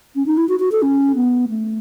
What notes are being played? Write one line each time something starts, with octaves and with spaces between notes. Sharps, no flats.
C#4
D#4
E4
F#4
F#4
A4
C#4
B3
A3